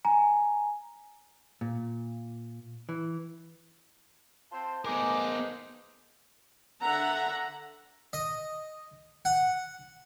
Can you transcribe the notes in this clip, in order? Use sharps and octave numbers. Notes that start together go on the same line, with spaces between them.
G#5 A#5
A#2
E3
C4 F4 C5 A5
G#3 B3 C4 D4 D#4 A#4 G#5 D6
D3 E5 F#5 A#5
D#5
F#5